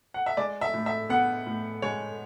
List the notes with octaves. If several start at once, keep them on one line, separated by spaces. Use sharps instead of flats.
F#5
E5
G#3 D5
E5
A2
E5
B3 F#5
A2
G#3 C#5